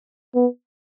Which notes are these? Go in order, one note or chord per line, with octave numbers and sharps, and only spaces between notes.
B3